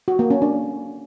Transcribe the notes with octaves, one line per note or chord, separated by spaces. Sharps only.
F#4
A#3
C#4
D4